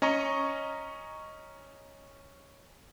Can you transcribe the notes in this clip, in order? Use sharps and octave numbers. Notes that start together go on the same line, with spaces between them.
C#4 D#5 A#5 C#6